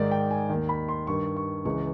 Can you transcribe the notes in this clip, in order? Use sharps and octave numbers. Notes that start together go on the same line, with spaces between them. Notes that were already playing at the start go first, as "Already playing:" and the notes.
Already playing: G#2 D#3 D5
G5
G#5
D#2 D#3
B5
C6
G2 D#3 C#6
C#6
C#2 C#3 E3 C#6